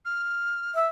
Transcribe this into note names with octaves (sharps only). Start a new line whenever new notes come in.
F6
E5